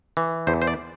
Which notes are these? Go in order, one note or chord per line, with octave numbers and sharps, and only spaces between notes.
E3
E2 C5
C5
D5